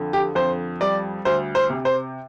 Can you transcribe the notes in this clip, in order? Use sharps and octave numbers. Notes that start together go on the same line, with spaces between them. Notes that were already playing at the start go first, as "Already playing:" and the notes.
Already playing: F2 D3
G4
F2 C5
G3 D5
D2 C5
C5
C3
C5